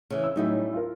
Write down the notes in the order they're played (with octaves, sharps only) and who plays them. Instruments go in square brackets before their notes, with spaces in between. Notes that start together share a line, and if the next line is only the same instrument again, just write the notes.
[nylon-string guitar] C#3 E3
[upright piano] E6
[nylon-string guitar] A2 G3 C#4 [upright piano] F#3 D#4 E4
[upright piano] F4 A#4